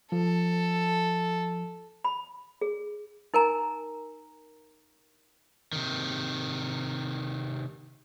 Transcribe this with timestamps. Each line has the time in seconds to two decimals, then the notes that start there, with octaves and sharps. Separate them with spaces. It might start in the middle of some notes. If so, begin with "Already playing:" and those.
0.12 F3 A4
2.05 B5
2.61 G#4
3.34 D#4 A#4 G#5 A#5
5.73 C3 D#3